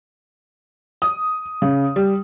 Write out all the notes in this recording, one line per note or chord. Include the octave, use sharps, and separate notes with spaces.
D#6
C#3
G3